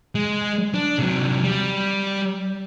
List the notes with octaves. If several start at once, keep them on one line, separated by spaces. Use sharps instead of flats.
G#3
D4
C3 F#3
G3